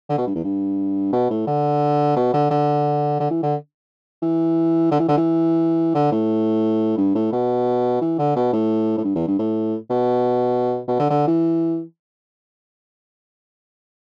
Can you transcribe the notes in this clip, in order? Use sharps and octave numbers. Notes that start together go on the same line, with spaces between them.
D3
B2
G2
E2
G2
B2
A2
D3
B2
D3
D3
D3
E3
D3
E3
D3
E3
D3
E3
D3
A2
G2
A2
B2
E3
D3
B2
A2
A2
G2
E2
G2
A2
B2
B2
D3
D3
E3